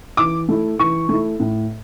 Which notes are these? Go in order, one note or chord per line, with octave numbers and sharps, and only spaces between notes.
E3 D6
A3 E4
E3 C#6
A3 E4
A2